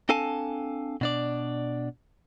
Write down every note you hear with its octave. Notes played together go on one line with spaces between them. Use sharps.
C4 D4 A4 F5 G#5 A5
B2 D4 D5